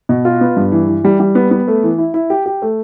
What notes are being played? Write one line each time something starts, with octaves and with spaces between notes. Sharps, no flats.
B2
F4
B3
G2
E3
E3
G3
G3
B3
B3
A3
E3
E4
E4
G4
G4
A3